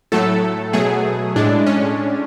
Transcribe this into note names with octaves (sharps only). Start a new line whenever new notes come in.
A2 F#3 A3 A4
B2 F#3 A3 G#4
A2 G#3 D4
C#4